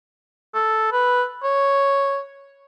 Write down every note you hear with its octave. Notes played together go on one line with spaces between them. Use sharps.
A4
B4
C#5